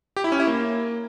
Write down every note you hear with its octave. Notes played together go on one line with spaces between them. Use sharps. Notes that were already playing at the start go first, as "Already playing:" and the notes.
G4
E4
C#4
E4
A#3